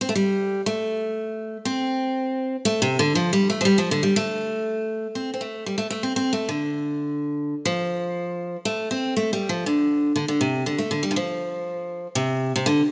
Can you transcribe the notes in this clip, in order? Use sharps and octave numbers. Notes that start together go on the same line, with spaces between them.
C4
A3
G3
A3
C4
A3
C3
D3
F3
G3
A3
F3
G3
F3
D3
G3
A3
C4
C4
A3
G3
A3
A3
C4
C4
A3
D3
F3
A3
C4
A3
G3
F3
D3
D3
D3
C3
D3
A3
D3
G3
D3
F3
C3
C3
D3